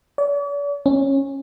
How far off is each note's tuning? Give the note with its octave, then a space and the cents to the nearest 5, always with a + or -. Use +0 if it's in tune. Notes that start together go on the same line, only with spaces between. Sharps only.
D5 -45
C#4 -20